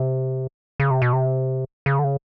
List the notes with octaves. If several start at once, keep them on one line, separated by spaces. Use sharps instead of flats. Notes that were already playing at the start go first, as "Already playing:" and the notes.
Already playing: C3
C#3
C3
B2
C3
C#3
D3
C#3